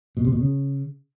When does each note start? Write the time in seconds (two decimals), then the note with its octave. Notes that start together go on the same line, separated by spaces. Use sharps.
0.17 B2
0.25 C3
0.32 B2
0.40 C#3